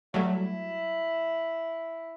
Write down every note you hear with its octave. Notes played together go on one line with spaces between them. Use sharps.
F#3 G3 A3 E4